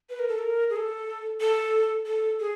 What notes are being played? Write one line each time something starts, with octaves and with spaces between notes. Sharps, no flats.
B4
A#4
A4
A#4
G#4
A4
A4
A4
G#4